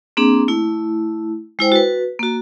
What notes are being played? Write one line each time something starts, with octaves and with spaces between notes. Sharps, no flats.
A#3 C4 D4 G#4
A3 E4
G#3 E4 C5 G5
F#4 B4
A#3 F#4